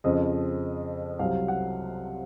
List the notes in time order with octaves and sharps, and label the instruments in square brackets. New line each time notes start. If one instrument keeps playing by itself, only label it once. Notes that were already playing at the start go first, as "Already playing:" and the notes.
[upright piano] F2 C#3 F3 D#5
C2 C3 F#3 F5
F#5